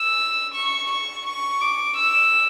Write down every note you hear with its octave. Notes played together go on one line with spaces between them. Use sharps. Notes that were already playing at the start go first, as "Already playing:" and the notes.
Already playing: E6
C#6
C#6
C#6
D6
E6